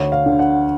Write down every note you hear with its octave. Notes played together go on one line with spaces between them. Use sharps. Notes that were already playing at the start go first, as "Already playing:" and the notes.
Already playing: D2 C#5
F5
D3
F#5